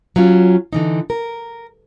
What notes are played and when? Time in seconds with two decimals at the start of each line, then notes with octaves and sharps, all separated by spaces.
0.16 F#3 C#4 F4
0.73 D3 E3 D#4
1.10 A#4